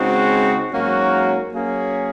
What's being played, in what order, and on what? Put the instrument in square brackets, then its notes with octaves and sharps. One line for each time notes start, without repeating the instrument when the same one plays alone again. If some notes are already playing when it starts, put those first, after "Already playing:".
Already playing: [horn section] C#3 G#3 C4 D#4 F#4
G#2 F#3 A#3 C#4 F#4
F#3 A#3 C#4 G#4